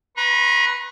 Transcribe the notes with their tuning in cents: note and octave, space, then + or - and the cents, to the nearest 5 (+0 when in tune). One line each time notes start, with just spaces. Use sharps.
B4 +0 A#5 +35 C#6 -40